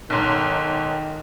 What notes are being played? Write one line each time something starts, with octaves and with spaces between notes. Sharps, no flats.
B1 G#2 D#3